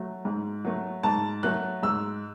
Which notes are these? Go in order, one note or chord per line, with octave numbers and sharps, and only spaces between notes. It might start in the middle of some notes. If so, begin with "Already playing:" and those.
Already playing: F#3 A3
G#2
F#3 A3
G#2 A5
F#3 A3 F#6
G#2 E6